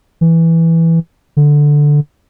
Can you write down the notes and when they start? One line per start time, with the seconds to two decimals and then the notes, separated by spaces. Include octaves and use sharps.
0.21 E3
1.37 D3